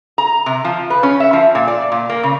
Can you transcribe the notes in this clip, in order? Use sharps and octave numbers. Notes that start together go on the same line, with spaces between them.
A#5
C3
F3
B4
C#4
E5
F3
A#2
D5
A#2
A#3
C#3